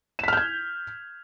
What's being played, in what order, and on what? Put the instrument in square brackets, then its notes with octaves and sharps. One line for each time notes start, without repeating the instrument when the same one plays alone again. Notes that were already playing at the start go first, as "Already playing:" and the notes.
[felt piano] E7
B6
F6
G6
G#6